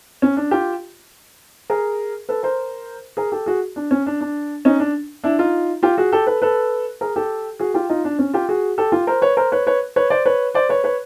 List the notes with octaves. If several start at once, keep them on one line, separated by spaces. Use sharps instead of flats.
C#4
D4
F4 G4
G#4 A#4
A4 B4
A#4 C5
G#4 A#4
G4 A4
F#4 G#4
D4
C#4
D4
D4
C#4 D#4
D4
D4 E4
D#4 F4
F4 G4
F#4 G#4
G4 A4
A4 B4
A4 B4
G#4 A#4
G4 A4
F#4 G#4
F4 G4
D#4 F4
D4
C#4
F4 G4
F#4 G#4
G4 A4
F4 G4
A#4 C5
B4 C#5
A#4 C5
B4 C#5
B4 C#5
B4 C#5
C5 D5
B4 C#5
C5 D5
B4 C#5
B4 C#5